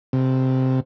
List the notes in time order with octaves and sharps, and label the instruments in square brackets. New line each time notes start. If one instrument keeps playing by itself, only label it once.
[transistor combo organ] C3